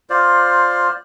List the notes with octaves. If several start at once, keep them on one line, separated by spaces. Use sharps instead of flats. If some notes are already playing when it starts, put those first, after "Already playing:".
F4 C5 D5